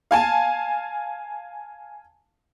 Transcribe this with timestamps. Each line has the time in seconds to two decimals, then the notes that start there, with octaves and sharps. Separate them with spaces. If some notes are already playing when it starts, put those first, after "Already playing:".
0.11 F5 G#5 A5